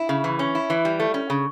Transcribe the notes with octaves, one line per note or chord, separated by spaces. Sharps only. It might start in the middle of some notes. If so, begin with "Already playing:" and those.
Already playing: E4
C#3
E3
C#4
E4
E3
G3
A3
C#4
C#3